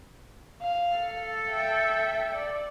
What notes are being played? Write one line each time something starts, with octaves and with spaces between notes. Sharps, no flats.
F5
A4
E5 G5
D5